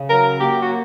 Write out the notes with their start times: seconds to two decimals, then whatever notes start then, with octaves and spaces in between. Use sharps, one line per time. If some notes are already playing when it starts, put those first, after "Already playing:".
Already playing: C#3
0.09 F#3 A#4
0.40 A#3 G4
0.62 F#4